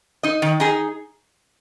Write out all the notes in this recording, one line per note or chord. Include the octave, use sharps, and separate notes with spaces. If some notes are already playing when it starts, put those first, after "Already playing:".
D#4 D#5
D#3
D#4 G#4